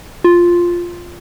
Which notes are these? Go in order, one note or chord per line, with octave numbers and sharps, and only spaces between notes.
F4